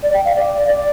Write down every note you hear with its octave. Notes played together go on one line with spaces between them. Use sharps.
D5
G5
F5
D5
D5